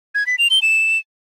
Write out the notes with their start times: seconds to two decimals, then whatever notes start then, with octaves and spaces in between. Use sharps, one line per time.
0.15 G#6
0.27 B6
0.38 F7
0.50 G7
0.62 E7